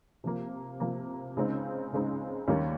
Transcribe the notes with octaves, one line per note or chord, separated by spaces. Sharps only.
C3 F3 A#3
C3 F3 A#3
C#2 C#3 G#3 C4 D#4
C#2 C#3 G#3 C4 D#4
D#2 D#3 G3 A#3 C#4